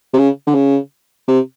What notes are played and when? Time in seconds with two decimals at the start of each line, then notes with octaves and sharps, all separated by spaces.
0.14 C3
0.18 C#3
0.47 D3
0.54 C#3
1.28 C3